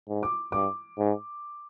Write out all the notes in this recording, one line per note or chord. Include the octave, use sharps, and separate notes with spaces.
G#2
D6
G2 D6
G#2